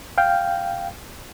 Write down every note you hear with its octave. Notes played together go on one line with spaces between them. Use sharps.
F5 G5